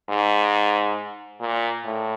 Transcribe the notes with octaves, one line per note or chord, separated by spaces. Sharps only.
G#2
A#2
A2